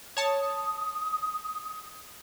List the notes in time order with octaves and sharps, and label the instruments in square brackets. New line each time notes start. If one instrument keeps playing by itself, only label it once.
[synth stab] C#5 A5 [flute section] D#6